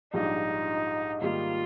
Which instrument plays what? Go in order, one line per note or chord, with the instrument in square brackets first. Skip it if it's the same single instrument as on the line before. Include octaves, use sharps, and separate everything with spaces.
[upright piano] A#1 G#2 G3 D4 F4 [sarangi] D#4
[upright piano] G#2 D#3 G3 A#3 [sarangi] F4